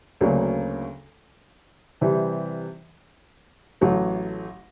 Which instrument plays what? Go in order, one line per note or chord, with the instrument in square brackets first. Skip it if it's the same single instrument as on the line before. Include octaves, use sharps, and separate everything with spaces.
[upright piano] D2 C#3 F#3 A#3 D4
C3 E3 G3
A1 A2 F#3 A3